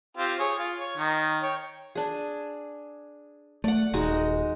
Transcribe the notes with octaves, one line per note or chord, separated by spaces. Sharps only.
C4 F4 G4
G#4 C#5
F4
C#5
D#3
C#5 G5
D4 G#4
A3 D5 F#5
D#1 G#3 D#4 F#4